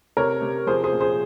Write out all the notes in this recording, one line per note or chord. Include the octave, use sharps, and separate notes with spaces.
C3 A#4 C#5
C3
F3 G#4 C5
G#4 C5
A#2
G#4 C5